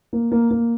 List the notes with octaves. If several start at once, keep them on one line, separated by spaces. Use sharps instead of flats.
A#3
A#3
A#3